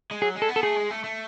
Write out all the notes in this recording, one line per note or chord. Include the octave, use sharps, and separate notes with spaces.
G#3
F#3 G#4
G#3
A4
B3
A4
A3 G#4
G#3
A3
A3